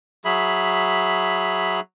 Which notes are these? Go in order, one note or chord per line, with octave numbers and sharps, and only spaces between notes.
F#3 G#4 E5 B5